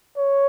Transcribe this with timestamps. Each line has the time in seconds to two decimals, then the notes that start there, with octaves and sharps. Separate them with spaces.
0.18 C#5